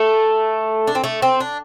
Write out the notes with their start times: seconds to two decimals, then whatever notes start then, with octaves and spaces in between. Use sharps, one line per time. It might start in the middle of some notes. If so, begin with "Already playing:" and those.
Already playing: A3
0.87 D4
0.95 C4
1.04 A3
1.22 C4
1.40 D4